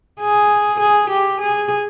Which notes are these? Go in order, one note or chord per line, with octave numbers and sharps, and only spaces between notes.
G#4
G#4
G4
G#4